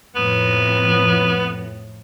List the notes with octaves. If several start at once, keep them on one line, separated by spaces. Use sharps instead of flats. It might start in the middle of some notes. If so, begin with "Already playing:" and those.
F2 A2 B3